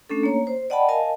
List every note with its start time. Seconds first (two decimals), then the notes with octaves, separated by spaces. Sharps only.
0.09 A3 C#4 D4 A4
0.23 A#3 C#5 A#5
0.47 C5
0.70 D5 D#5 F#5 G5 A5 B5
0.89 A#4 D#5 F5 G#5 A5